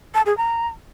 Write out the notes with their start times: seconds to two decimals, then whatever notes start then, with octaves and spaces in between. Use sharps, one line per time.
0.14 A5
0.26 G#4
0.37 A#5